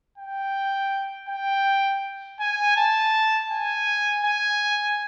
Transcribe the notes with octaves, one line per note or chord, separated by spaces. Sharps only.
G5
G5
G#5
A5
G#5
G#5